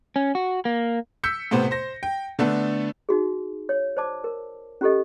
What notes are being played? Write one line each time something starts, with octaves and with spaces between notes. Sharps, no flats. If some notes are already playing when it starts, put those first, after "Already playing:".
C#4
F#4
A#3
E6 G6 B6 C#7
A2 C3 B3 C5
C5 A#6
G5
D3 A3 B3 D4 A4
D#4 F#4 G#4
C#5
C5 D5 A5 D6
A#4
C#4 F4 G4 A4 D#5